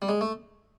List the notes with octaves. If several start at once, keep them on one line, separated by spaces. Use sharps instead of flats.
G3
G#3
A3